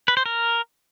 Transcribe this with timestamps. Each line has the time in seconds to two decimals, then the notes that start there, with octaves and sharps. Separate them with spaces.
0.08 B4
0.17 C5
0.26 A#4